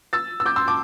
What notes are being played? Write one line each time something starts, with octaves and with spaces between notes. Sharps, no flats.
E6 A6
E6
D6 G6
C6 E6
A5 D6